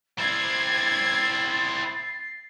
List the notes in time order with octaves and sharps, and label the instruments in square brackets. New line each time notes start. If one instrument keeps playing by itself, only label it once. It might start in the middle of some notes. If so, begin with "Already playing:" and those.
[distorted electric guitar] C4 E4 [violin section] G#6 [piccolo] A6 [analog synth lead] C7